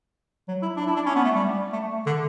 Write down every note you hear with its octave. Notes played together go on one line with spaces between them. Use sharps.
F#3
E4
D4
E4
D4
C#4
B3
A3
G3
A3
D3